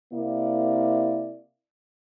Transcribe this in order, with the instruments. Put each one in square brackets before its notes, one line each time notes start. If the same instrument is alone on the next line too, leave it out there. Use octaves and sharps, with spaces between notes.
[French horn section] C3 A#3 E4 D5